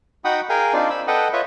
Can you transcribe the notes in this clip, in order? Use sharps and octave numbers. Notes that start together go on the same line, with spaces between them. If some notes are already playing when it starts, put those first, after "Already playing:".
D#4 F#4 F#5 G5 B5 D#6
G#4 A#4 F5 G5 G#5
C4 D4 D#4 F4 D5
B5 E6
A4 B4 D#5 F#5 G5
F4 B4 C#5 D#5 E5